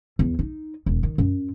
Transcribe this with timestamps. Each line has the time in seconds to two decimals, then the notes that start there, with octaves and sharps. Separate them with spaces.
0.19 E2
0.39 D#4
0.86 E1
1.03 D#3
1.18 F#2